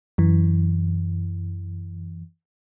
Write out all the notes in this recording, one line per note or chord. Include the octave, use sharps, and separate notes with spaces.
F#2 E3